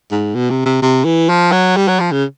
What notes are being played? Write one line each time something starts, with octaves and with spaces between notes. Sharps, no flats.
G#2
B2
C3
C3
C3
E3
F3
F#3
G3
F#3
F3
C#3